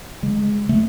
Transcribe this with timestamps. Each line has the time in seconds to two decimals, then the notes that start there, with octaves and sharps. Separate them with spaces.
0.23 C#3 G#3
0.69 C#3 A3